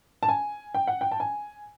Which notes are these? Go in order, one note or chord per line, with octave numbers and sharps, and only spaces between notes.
A5
G#5
G5
F#5
G5
A5
G#5